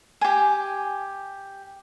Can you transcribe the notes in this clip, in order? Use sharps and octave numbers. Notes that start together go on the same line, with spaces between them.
G4 G#5